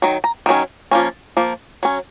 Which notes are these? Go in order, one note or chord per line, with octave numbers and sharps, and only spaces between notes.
D#3 F#3
A#5
D#3 F#3 C#4
F3 A#3 C#4
F3 A#3
F#3 C#4